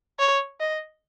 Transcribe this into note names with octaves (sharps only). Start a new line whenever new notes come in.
C#5
D#5